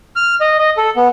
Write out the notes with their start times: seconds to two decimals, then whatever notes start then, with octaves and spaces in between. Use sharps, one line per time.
0.16 F6
0.40 D#5
0.59 D#5
0.77 A4
0.96 B3